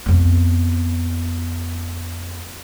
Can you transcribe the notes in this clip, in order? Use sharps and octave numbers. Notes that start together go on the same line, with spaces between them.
F2 B3